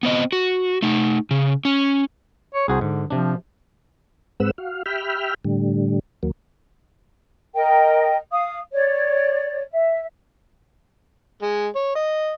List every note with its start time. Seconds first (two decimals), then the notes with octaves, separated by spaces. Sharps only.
0.03 B3 C4 D#5
0.32 F#4
0.82 A3 D#4
1.31 C#3
1.65 C#4
2.54 C#5
2.68 C2 F#4 G#4 C5
2.81 G#2 D3
3.10 C3 F3 D4
4.40 G#2 G#3 C4 B4 F#5 E6
4.58 F#4 F5
4.86 G4 E5 G5 B5 F6
5.45 A2 D3 G3
6.23 D#2 F#3 A#3
7.55 A#4 D#5 G5
8.31 F5 D#6
8.72 C#5 D5
9.72 E5
11.42 G#3
11.75 C#5
11.95 D#5